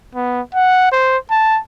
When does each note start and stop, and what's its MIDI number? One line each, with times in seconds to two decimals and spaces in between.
0.15 0.41 59
0.55 0.89 78
0.92 1.17 72
1.31 1.60 81